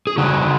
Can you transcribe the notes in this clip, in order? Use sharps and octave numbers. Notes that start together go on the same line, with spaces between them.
G#4
C#3 D#4 F#4